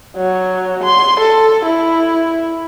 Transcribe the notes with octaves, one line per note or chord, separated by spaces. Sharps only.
F#3
C6
A4
E4